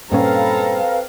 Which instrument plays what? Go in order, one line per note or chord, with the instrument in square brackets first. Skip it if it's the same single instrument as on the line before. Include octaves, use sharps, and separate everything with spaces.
[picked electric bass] G2 A#2 C#4 [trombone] C4 [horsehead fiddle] A4 A#5 [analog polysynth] B4 F5